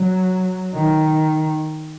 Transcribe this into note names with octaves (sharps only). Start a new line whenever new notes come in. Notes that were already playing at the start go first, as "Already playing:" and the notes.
Already playing: F#3
D#3